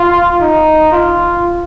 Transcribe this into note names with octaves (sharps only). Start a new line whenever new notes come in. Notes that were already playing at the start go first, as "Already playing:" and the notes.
Already playing: F4
D#4
F4